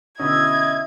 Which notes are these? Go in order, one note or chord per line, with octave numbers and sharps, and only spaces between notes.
B2 D3 C#4 E4 D#5 E5 G#6